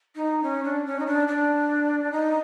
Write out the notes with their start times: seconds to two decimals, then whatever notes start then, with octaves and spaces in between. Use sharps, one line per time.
0.16 D#4
0.43 C#4
0.64 D4
0.86 C#4
0.99 D#4
1.07 D4
1.28 D4
2.12 D#4